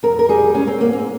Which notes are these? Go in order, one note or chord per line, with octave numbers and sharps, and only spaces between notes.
F2 A#4
A#4
G3 G#4
G#3 C#4
C4
G#2 A#3
C4